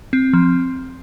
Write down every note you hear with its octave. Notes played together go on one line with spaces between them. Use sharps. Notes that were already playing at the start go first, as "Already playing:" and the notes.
C4
F3